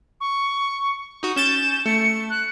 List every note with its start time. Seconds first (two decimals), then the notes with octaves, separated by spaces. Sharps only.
0.20 C#6
1.23 D#4 F#4
1.36 C#4 G6 A6 E7
1.86 A3 C#7
2.30 F#6